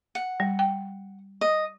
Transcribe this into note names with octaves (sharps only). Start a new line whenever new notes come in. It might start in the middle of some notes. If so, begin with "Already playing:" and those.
F#5
G3
G5
D#5